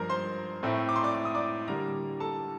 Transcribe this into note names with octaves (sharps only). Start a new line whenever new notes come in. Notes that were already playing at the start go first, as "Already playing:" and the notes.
Already playing: G2 F3 A#3 A#4 A#5
C5 C6
A2 A3 C4
D6
C6
D5 D6
D6
D#6
D5 D6
D3 G3 A#3 A#4 A#5
A4 A5